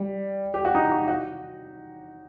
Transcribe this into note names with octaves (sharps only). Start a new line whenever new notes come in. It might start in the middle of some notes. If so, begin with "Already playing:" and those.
Already playing: G3
G4
F#4
D#4
F#4
F#4